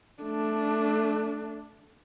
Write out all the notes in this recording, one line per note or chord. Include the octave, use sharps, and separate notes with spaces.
A3 D4